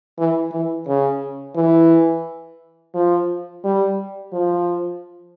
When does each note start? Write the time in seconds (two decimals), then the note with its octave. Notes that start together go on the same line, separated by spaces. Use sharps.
0.18 E3
0.52 E3
0.88 C#3
1.56 E3
2.95 F3
3.64 G3
4.33 F3